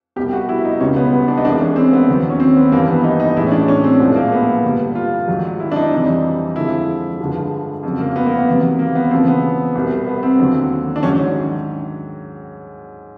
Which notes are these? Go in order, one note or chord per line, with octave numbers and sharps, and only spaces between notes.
C2 B2 G3 G4
F#4
E4
D#4
C#2 B2 G3 C#4
B3
B3
D4
D#4
C2 C3 E3 G#3 D4
C#4
C4
B3
D#2 D#3 F#3
C#4
C4
B3
G2 E3 G3 A#3
B3
D#4
D#4
A2 E3 G#3 E4
C#4
D4
C#4
C4
C2 A#2 F3 G#3
A#3
B3
G2 D3 G3
F4
G#2 D#3 F#3
E4
D4
D#4
F2 C3 E3 G3
F2 D3 F3 G#3 E4
G2 D3 F3 G#3
F2 C#3 F#3
A#3
B3
A#3
B3
E2 C3 D#3 F#3
A#3
B3
E2 C#3 F3 C4
B3
C2 B2 G3
B3
C4
D#2 D3 F#3
D4
G#2 D#3 F#3 C#4